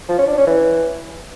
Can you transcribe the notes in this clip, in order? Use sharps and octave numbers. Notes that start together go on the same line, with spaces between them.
F3
C#4
D4
C#4
E3